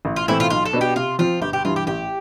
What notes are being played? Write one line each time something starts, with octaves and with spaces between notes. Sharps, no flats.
A1
F4
A2 E3 A3 C4 E4
F4
B1 F4
A4
B2 B3 D4
G4
C3 F4
F3 C4 F4
G1 G4
G4
G2 E3 F4
G4
A1 G4